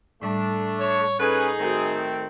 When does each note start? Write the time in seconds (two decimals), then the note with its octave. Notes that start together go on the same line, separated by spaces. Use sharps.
0.22 A2 G3 A3 D4
0.78 C#5
1.20 C#4 D#4 G#4 A4 B4 G#5
1.59 D#3 A3 C4 F#4 A#4